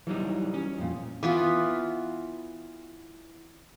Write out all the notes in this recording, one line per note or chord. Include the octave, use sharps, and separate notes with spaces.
E3 F#3 G3 D#4
C#4
F2 A#2
E3 B3 F4